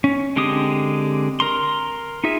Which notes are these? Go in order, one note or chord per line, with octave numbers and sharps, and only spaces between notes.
C#4
D3 G#3 C4 G4 D#6
A#4 A#5 C6
D#4 F4 G#4 E5